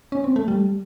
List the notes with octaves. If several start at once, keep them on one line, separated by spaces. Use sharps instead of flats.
C#4
C4
A3
G3